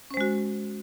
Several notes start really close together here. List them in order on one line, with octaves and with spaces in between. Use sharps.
C#4 C5 G#3 F#4